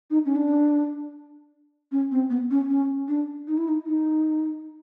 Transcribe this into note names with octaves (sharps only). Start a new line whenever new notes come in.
D#4
C#4
D4
C#4
C4
B3
C#4
C#4
D4
D#4
E4
D#4
D#4